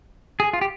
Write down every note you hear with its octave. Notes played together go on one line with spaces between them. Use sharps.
G#4
F4
G4